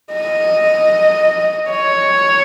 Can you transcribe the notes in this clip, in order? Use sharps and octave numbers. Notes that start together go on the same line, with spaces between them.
D#5
C#5